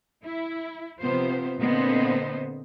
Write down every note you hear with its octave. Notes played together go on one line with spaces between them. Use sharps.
E4
C3 F3 B3 F4 C5
A#2 D3 B3 C4 C5 D#5